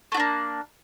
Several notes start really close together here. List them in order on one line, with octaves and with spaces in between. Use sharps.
A3 F#4 D4 A#3